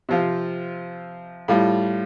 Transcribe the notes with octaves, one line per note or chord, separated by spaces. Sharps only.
C3 F3 C4 F4
A2 G3 F4